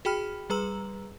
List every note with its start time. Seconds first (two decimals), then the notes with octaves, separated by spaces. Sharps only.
0.05 F#4 G#4 G5 B5 F6
0.50 G3 G#4 B4 A#5 E6 F#7